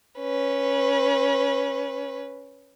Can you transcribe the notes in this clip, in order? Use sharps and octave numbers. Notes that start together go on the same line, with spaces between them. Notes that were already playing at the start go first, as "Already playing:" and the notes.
C#4 B4